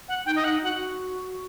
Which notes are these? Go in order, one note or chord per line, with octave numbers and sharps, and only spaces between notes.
F#5
D#4 G5
D#5
D#4 F#5
F#4 F#5